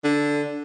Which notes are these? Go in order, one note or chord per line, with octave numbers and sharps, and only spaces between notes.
D3